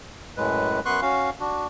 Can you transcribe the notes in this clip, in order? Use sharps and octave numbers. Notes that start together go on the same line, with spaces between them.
F#2 A2 G#3 B4
F#2 B3 B4 C6 C#6 F#6
C#4 F#4 F5
D4 F#4